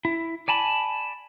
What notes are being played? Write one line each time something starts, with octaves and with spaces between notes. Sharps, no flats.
E4
D5 G#5 A5 B5